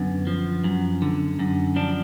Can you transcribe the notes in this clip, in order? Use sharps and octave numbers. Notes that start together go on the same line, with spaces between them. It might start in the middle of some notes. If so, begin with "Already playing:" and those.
Already playing: F#2 D3 B3
F3
F#2
D3
F#2
F3 D4